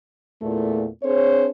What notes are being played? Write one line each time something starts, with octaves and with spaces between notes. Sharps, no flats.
E2 A#2 A3
C4 D4 G#4 C5 C#5